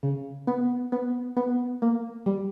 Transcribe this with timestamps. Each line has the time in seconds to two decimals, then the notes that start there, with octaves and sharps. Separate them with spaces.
0.03 C#3
0.47 B3
0.92 B3
1.37 B3
1.82 A#3
2.26 G3